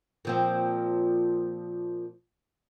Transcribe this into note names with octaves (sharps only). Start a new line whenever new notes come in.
A#2 F3 C4